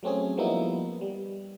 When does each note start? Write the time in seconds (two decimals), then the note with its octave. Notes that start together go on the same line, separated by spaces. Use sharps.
0.03 F#3 A3 C4 C#4 G#4
0.37 F3 G3 A#3 B3 D#4 E4
1.01 G3